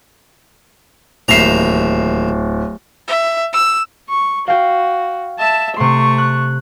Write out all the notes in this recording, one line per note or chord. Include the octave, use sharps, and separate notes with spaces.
D1 D#2 E5 A#5 C7
E5
E6
C#6
F#4 F5 G5
E5 A5
C3 A3 C6 C#6
F#6